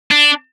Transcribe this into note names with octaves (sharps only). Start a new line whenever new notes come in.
D4